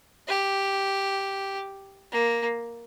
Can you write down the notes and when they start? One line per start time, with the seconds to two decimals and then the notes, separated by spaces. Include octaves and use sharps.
0.28 G4
2.12 A#3